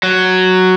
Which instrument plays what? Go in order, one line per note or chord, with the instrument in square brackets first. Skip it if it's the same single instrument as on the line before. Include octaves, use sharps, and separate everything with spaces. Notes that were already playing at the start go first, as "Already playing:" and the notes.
[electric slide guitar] F#3